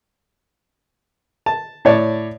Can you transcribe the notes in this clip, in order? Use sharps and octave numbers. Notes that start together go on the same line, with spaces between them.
A5
A2 C#5 D5 A5